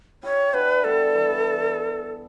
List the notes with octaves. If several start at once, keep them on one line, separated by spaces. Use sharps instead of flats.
E4 G4 C#5
D4 F#4 B4
G3 B3 A4
E3 G3